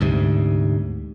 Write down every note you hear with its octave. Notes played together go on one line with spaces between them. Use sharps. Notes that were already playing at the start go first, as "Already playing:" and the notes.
D2 G#2 C3